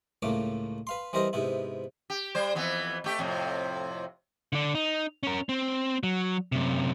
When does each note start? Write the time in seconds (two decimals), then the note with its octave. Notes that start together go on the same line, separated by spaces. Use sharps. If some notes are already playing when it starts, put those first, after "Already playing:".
0.22 C#2 A2 A3 A#3 D6
0.87 B4 F5 C6
1.13 E3 G3 C4 A#4 C5 D#5
1.33 G#2 C3 B3 E4
2.10 G4
2.35 G3 C5
2.55 F2 E3 B3
3.04 A3 G4
3.19 F2 A2 C3
4.53 D3 D4
4.75 D#4
5.23 C#4 A#4
5.49 C4
6.03 F#3
6.52 F#2 C3